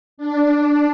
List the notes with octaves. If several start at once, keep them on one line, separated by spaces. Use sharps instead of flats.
D4